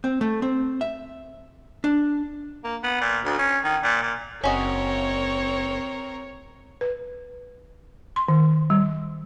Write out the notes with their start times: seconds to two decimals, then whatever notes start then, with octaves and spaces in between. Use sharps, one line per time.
0.04 C4
0.21 A3
0.42 C4
0.81 E5
1.84 D4
2.64 A#3
2.83 B3
3.01 A#2
3.25 D2
3.38 C#4
3.64 D#3
3.83 A#2
4.02 A#2
4.44 F#1 C4 C#4 F#4 A#4 C#5 D#5
6.81 B4
8.16 C6
8.28 D#3
8.70 G3